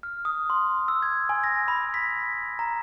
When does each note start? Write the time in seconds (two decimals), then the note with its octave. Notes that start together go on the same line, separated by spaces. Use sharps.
0.03 F6
0.25 D#6
0.50 C6
0.88 E6
1.02 G#6
1.29 G#5
1.44 A#6
1.68 B5
1.94 B6
2.59 A#5